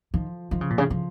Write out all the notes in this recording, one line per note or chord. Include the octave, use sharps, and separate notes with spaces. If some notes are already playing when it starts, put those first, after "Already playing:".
D#3 F3
D#3 F3
C#3
A#2
C#3
C#3 F3